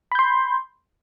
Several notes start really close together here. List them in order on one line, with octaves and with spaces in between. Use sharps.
B5 G6 C6